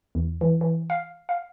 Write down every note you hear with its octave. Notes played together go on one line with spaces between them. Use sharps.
E2
E3
E3
F5
F5